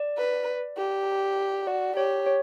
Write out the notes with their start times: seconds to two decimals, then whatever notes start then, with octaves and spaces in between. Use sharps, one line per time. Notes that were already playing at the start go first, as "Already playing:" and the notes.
Already playing: D5
0.18 B4
0.78 G4
1.67 F#4 D5
1.97 G4 C#5
2.26 C#5